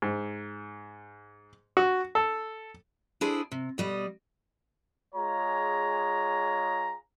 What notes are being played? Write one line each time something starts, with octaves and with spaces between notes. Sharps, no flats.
G#2
F#4
A4
D4 E4 G#4 C5
C3
B2 G3 D#5
G#3 F4 G#4 C#5 A#5